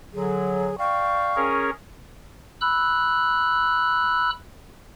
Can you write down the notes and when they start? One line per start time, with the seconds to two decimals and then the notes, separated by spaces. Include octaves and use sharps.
0.14 D3 F#3 G#4
0.79 D5 F5 G5 C#6
1.36 C#4 G#4 A#4
2.61 B5 E6 F#6